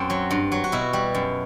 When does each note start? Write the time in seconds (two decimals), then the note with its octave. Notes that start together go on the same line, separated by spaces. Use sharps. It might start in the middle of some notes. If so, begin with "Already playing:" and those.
Already playing: F#2 C4
0.10 F#3
0.31 G2
0.52 F#3
0.64 F#4
0.72 B2 E4
0.93 G3
1.15 F#2